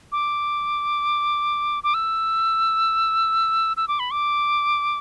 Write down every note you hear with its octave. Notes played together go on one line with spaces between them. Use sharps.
D6
D6
E6
E6
D6
B5
D6